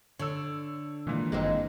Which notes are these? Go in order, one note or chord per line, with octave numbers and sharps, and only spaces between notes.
D3 C#5 E6
A#2 D#3 E3 G#3
G1 D#3 G#3 A#3 C4